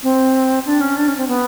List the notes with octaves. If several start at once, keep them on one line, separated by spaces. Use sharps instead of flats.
C4
D4
C#4
D4
C#4
C4
B3